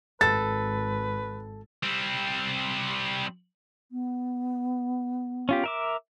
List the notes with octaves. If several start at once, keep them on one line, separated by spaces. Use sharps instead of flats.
G#1 A4 B4 A6
G3 C4
B3
C#4 F4 G4
A#4 E5 D6